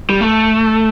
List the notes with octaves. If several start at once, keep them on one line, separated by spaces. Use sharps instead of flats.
G3
A3